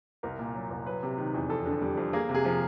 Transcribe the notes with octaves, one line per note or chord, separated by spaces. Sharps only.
C2 A#4
A#2
F#3
C2
F#3 B4
C3
D#3
E2
F2 A4
D3
G3
F2
A#3 G#4
C3
G#4
F3